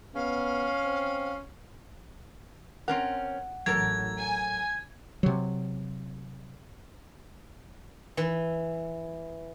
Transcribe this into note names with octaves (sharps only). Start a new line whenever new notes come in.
B3 C#4 F5
C4
C4 C#4 A#4 F#5
A1 F#3 A4 A#4 G#6
G#5
C3 F#3
E3